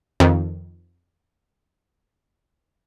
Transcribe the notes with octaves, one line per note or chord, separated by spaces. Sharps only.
F2 D#3